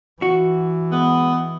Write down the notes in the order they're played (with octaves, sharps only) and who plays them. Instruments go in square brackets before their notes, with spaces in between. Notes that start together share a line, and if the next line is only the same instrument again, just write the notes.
[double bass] E3 [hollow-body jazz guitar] F#4
[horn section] G#3 B3